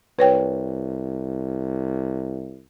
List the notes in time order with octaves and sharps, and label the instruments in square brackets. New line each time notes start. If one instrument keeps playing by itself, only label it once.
[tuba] C2 [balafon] B4 C#5 G5